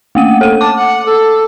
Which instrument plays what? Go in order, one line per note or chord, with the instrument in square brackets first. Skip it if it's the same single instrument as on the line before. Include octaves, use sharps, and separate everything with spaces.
[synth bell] A3 A#3 D#7
A4 D#7
[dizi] A5 [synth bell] D6
[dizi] F#5
A4